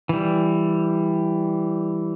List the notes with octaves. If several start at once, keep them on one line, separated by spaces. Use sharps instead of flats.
E3 G3